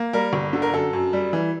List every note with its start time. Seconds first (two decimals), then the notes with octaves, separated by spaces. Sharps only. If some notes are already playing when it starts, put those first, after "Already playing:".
Already playing: A#3
0.13 G3 A#4
0.33 G1
0.53 D3
0.62 A#4
0.73 F#2 A4
0.93 F#2
1.13 G3
1.33 E3